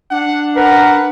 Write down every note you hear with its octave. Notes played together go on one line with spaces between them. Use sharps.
D4 F#5
A#4 B4 F#5